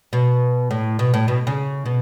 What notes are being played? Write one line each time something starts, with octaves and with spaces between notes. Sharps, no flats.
B2
A2
B2
A2
B2
C#3
B2